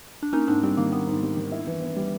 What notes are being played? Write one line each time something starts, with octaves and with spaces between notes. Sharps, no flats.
D4
A#3 C#4 D#4
G#2 C4 D4
G3 C4
D#3 A#3
A#3 B3
G#2
G3
D#3
E4
E3
B3
G3